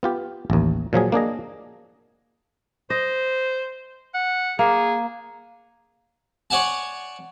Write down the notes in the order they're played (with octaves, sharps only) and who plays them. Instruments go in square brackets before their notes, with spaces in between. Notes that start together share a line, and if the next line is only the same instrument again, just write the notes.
[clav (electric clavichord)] B3 F4 G4
A1 D#2
A#2 F3 F#3 G#4
A#3 D4 G#4 D#5
[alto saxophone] C5 [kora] D#5
[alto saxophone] F#5
[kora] A#3 [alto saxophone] G#4
[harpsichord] C#5 D5 F#5 G#5 A5